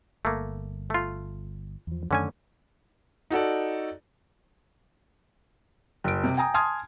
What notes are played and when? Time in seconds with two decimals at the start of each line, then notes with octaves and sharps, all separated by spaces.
0.25 G1 A3 A#3
0.90 A3 F4
1.87 E2 F3
2.11 F#2 D3 D#3 A3 C#4 G#5
3.30 D#4 F#4 A4 D5
6.04 F#1 D7
6.24 C3
6.37 G5 G#5 A#5 D#6
6.54 G#5 A5 C6 D#6 F6 G#6